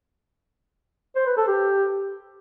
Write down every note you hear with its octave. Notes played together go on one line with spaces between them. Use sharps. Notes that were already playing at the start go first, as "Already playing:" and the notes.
C5
B4
A4
G4